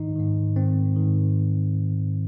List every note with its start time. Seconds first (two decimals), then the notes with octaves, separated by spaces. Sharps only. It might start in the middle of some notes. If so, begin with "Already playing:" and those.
Already playing: G#2 D#3 D#4
0.16 G#2 D#3
0.56 G#2 D#3 C4
0.96 G#2 D#3